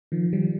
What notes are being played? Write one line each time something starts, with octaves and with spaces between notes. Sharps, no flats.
D#3 F3
F3 G3